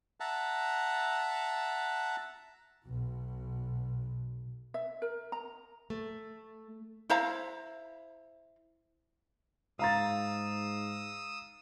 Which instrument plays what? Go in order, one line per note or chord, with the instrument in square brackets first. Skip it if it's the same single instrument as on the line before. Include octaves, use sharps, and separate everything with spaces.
[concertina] E5 F#5 A5 A#5
[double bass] B1 B2
[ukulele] E5
A#4
A#5
[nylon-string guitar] A3
[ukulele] E4 C5 F5 A#5
[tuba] G#2 [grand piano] F5 A#5 A6 [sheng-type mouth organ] D#6 E6